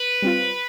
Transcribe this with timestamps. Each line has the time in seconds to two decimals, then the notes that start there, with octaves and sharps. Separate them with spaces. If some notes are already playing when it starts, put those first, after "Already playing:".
Already playing: B4
0.22 G3 C4 F4